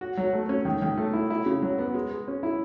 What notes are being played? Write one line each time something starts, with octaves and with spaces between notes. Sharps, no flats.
F#4
F#3
A3
C#4
D#3
D#3
A3
E4
E4
C#3
F#3
B3
G#3
G#3
C#4
E4